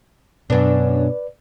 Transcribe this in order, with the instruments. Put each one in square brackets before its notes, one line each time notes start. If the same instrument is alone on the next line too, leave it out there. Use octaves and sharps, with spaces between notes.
[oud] F#2 D4 [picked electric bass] B2 [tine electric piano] B4 D5